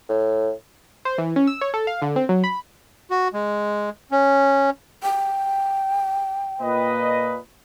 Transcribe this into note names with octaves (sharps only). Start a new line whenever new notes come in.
A2
C5
E3
C#4
E6
C#5
A4
F5
D3
C4
F#3
B5
F#4
G#3
C#4
G5
A#2 B4 D#5